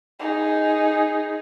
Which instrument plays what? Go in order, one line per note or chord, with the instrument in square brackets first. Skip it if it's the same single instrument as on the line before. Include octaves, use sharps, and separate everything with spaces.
[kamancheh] D#4 G#4